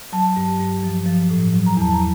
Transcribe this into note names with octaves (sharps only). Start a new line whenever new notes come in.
F#3 A5
G2
G2
F3
F3
A2
F#3
A#5
E2 A5
A#5